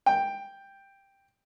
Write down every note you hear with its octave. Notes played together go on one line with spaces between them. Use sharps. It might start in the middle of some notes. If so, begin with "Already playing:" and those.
G5